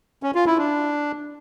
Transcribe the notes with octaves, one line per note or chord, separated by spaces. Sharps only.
C#4
F4
E4
D4